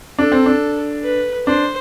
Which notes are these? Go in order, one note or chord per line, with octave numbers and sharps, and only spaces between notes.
D4 A4
C4
D4
B4
D4 C5